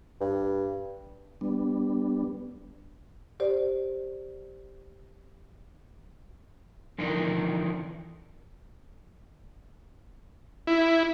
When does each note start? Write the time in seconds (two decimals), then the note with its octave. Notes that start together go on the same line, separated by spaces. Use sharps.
0.21 G2
1.41 G3 B3 D4
3.40 G4 C5 D5
6.98 D3 E3 F3 D4 D#4 A#4
10.67 E4